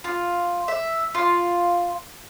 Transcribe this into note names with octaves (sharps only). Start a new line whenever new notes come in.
F4
E5
F4